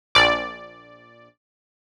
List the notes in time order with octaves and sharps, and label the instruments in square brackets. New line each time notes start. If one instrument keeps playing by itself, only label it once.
[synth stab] A#1 D5